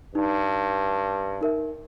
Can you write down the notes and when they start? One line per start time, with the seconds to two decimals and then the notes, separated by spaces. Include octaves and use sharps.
0.15 G2 D#4
1.41 D#4 A#4 E5